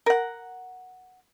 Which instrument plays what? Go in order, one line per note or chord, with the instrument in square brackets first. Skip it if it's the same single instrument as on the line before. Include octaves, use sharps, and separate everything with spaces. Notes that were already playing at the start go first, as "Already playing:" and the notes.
[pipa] A#4 F#5